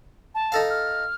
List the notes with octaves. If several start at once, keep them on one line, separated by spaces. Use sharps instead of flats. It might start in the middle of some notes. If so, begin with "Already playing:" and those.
A5
D#4 A4 F5
F6